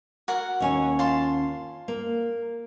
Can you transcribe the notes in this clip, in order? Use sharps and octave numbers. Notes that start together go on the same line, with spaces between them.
F#4 A#4 F#5
D#2 C#4 G#5
F4 A5 C6
A#3